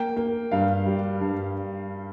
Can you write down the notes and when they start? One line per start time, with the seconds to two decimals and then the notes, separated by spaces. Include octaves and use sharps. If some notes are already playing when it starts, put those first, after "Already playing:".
Already playing: A#3 G5
0.17 A#3
0.52 G2 F5
0.86 G3
1.21 G2